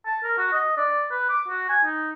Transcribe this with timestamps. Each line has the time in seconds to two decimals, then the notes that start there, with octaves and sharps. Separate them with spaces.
0.06 A5
0.23 A#4
0.38 F#4
0.53 D#5
0.77 D5
1.11 B4
1.29 D6
1.48 F#4
1.69 G#5
1.84 D#4